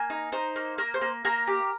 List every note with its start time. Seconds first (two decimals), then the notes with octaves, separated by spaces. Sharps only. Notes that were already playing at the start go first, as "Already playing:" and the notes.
Already playing: A#3 G#5
0.10 D#4
0.32 D#4 C5
0.56 A#3
0.78 A#3 A#4
0.94 C5
1.01 A#3
1.25 A#3 A#4 A#5
1.47 G4